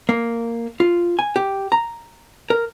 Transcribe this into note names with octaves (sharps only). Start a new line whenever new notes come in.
A#3
F4
G#5
G4
A#5
A#4